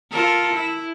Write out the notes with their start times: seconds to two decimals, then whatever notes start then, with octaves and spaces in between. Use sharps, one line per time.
0.11 F4 A4 A#4
0.53 E4